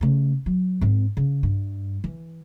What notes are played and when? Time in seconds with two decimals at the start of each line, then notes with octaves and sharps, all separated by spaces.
0.01 C#3 A3
0.46 F#3
0.81 G#2 C4
1.17 C#3
1.43 G2
2.04 E3